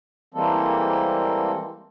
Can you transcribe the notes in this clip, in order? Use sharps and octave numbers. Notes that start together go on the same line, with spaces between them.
E3 G3 G#3 A#3 C4 A4